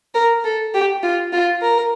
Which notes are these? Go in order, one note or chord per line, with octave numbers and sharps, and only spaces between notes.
A#4
A4
G4
F4
F4
A#4